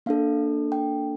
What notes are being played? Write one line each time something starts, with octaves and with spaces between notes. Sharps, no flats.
A#3 D4 A4 F5
G5